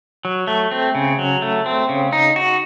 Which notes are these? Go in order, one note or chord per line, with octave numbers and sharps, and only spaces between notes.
F#3
A3
C4
C#3
F#3
A3
C4
C#3
D#4
F#4